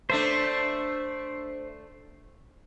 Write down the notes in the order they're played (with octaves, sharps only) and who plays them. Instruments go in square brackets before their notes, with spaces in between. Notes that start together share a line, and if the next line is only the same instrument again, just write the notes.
[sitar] A3 D4 [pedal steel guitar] C5 E5